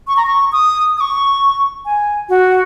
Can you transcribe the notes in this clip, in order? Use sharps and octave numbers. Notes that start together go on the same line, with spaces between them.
C#6
A#5
C#6
D#6
D#6
C#6
G#5
F#4